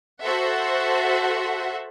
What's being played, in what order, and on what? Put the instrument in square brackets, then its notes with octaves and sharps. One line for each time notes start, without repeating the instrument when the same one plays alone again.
[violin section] F#4 A4 C5 E5 F#5